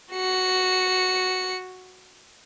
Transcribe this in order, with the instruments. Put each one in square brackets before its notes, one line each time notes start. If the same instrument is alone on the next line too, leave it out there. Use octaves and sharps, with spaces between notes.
[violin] F#4 C#7